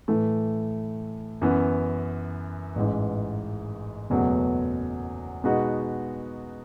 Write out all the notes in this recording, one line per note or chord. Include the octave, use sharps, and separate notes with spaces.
A2 E3 A3
F#2 E3 B3
A1 G#2 E3
F#1 E2 B2 F#3 A3
B2 G#3 B3 D#4 F#4